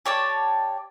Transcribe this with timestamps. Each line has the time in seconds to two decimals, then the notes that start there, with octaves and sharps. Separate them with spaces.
0.05 G4 C#5 D5 A5